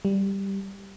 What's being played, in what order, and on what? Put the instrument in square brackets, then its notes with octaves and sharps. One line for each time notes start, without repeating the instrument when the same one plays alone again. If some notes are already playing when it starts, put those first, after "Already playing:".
[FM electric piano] G3